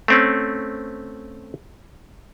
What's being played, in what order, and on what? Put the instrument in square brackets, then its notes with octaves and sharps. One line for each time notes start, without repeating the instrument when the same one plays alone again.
[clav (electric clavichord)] A3 C4 C#4